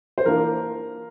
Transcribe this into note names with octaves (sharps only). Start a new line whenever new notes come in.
C5
E3 A#3 D4 F4 A#4